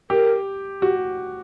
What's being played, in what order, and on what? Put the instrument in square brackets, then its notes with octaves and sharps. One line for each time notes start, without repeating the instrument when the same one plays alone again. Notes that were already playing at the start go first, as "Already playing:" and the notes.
[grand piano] G4 [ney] A#4
[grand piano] F#4 [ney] G4